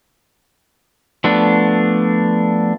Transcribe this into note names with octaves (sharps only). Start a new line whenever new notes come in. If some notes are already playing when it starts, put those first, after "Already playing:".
F3 A3 B3 D4